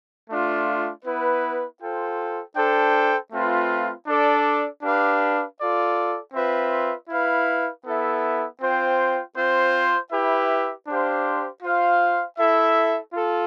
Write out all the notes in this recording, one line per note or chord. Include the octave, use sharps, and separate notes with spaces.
A3 D4 F4
B3 E4 B4
F4 A4 C5 G5
D4 A4 C5 G5
A3 C4 F4 B4
D4 A4 D5
D4 G4 B4 F5
F4 A4 D5
C4 F4 B4 E5
E4 B4 F5
B3 E4 A4 E5
C4 F4 C5 G5
C4 F4 C5
E4 G4 B4 E5
D4 G4 C5 F5
F4 C5 F5
E4 A4 E5
F4 A4